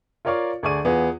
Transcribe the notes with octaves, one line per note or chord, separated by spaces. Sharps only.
F4 A#4 C#5 D5 F5 C#6
D2 G#4 D5 C#6 D#7
E2 B3 F4 G#4